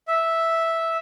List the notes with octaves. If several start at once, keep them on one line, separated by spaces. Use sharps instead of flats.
E5